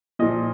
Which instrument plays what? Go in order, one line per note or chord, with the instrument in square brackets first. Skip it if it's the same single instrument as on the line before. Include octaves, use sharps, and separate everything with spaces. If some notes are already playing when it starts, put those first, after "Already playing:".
[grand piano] A#2 F3 D#5